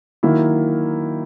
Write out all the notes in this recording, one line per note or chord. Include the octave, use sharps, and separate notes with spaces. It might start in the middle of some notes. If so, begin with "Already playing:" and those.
D#3 F#3 A#3 E4